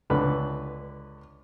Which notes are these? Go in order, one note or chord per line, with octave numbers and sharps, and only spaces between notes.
C#2 D3 B4